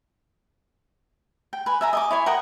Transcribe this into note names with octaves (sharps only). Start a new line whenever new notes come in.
G5
B4 G#5
E5 G#5 A#5
D#5 G#5 D6
E4 C#5 G#5
A#4 F#5 G5 D#6